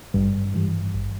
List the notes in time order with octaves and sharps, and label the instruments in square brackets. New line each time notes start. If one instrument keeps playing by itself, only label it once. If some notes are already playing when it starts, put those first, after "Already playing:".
[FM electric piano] G#1 [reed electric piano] G2
[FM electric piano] G#2 E3 G3
G#1